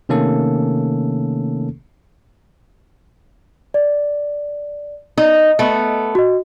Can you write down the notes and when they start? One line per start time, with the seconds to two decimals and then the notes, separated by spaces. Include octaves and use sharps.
0.09 C3 D#3 A3 A#3 C#4 A4
3.74 D5
5.18 D#4 D#5
5.59 A3 B3
6.15 F#4 D#5